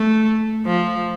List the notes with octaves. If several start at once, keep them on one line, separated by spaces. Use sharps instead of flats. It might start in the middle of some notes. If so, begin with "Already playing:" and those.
Already playing: A3
F3